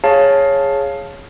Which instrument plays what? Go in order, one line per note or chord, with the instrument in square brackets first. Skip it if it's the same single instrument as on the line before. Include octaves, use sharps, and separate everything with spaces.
[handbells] G#4 C#5 F5 A5